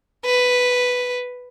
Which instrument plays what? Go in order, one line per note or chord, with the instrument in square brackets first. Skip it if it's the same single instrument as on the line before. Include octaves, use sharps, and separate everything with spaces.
[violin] B4